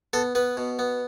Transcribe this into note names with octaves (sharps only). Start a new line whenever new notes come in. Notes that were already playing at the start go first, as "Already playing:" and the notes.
B3 A4
B3 B4
B2
B3